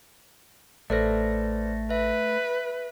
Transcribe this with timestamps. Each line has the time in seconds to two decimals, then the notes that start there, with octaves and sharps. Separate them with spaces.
0.90 A1 A3 A4 B4 C5 D5 A#6
1.90 B4 E5